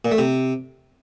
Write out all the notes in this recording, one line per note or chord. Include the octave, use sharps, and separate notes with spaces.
A#2
A3
C3